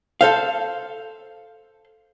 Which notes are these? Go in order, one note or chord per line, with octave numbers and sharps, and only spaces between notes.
A4 C5 F5